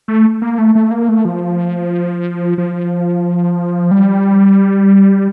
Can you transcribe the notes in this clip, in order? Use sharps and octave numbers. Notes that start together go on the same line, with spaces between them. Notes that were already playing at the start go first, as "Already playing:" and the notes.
A3
A#3
A3
A3
A#3
A3
F3
F3
G3